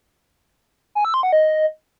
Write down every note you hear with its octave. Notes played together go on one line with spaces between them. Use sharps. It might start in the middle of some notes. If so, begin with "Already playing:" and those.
G#5
E6
C6
F#5
D#5